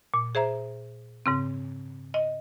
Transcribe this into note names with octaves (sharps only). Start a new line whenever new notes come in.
A#2
G#4 C5 E5 A#5
G#2 C#3 C4
D#5